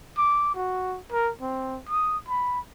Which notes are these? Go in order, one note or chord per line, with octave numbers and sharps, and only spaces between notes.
D6
F#4
A#4
C4
D#6
B5